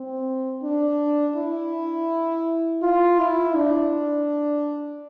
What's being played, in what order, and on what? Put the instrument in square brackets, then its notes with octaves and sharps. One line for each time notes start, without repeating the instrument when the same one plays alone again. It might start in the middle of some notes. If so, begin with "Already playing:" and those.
Already playing: [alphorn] C4
D4
E4
F4
E4
D4